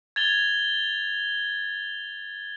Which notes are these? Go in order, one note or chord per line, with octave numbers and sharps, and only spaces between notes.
G#6 A6 F7 G7